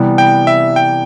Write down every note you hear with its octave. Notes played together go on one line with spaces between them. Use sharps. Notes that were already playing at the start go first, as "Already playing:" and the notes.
Already playing: C3 E3 G3 B3
G5
E5
G5